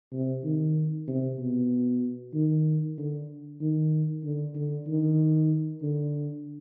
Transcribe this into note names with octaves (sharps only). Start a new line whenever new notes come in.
C3
D#3
C3
B2
D#3
D3
D#3
D3
D3
D#3
D3